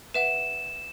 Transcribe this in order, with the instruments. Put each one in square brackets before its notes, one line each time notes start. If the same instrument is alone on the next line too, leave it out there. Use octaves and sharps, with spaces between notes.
[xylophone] B4 E5 F#5 [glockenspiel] E7